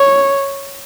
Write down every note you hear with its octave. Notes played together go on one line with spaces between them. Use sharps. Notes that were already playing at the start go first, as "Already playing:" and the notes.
Already playing: C#5